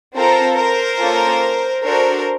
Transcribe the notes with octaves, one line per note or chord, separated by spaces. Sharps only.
C4 F4 A4 A#4 C5
A#4 C5
A#3 C#4 F4 A4
D4 F#4 A4 A#4 C5